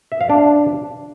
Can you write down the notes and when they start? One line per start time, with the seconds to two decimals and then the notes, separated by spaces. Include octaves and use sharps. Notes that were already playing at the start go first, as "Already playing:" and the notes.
0.12 E5
0.21 F5
0.30 D4